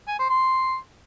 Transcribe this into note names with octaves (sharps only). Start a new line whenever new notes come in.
G#5
C5
C6